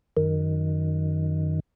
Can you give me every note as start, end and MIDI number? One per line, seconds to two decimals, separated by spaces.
0.17 1.60 42
0.17 1.60 51